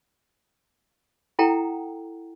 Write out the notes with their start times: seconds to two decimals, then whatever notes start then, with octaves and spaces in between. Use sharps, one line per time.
1.39 E4 A4 F#5 G5 A#5